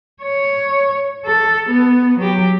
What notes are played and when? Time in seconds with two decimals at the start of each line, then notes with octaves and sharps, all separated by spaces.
0.23 C#5
1.26 A4
1.70 B3
2.18 F#3 G4